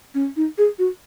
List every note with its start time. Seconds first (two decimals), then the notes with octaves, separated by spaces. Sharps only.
0.14 C#4
0.36 D#4
0.58 G#4
0.79 F#4